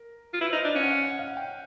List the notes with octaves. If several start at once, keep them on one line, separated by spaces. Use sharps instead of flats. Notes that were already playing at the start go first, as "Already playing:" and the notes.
Already playing: A#4
F4
E4 B4
C5
D#4
D#5
D4
C#4 F5
F#5
F5
F#5
F5
F#5
G5